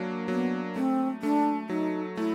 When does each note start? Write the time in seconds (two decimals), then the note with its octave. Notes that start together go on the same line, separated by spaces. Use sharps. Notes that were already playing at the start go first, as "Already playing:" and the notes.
Already playing: F#3 A#3 D4
0.28 F#3 B3
0.76 A3 C4
1.22 A3 D4
1.69 F#3 D#4
2.17 A3 E4